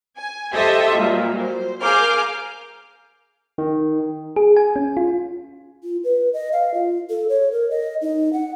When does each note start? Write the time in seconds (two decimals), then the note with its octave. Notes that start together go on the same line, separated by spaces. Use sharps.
0.17 G#5
0.54 G4 A4 C5 D#5 E5
0.96 A#2 F#3 G3
1.39 C5
1.82 G#4 A#4 F5 D6 F6 G6
3.58 D#3
4.36 G#4
4.57 G#5
4.76 C#4
4.97 F4
5.83 F4
6.04 B4
6.33 D#5
6.52 F5
6.74 F4
7.10 A4
7.29 C#5
7.52 A#4
7.70 D#5
8.01 D#4
8.33 F#5